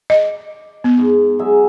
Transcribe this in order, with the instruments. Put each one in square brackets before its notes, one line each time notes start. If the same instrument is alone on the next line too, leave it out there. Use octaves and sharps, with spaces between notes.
[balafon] D#5 [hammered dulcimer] D6
[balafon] B3
[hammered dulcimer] G#2
F#3 G#4 E5